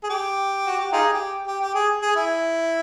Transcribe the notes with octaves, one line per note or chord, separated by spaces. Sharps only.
G#4
G4
F#4
G4
D#4 F4 G#4
G4
G4
G4
G#4
G#4
E4